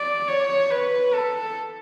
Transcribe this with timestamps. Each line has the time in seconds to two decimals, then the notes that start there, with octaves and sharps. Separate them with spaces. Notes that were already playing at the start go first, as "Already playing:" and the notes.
Already playing: D5
0.27 C#5
0.70 B4
1.14 A4